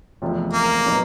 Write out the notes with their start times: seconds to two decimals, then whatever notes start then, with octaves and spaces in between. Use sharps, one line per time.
0.22 F1 E2 C3 F3
0.53 A#3
0.86 A#2 F#3 B3 D#4 F#4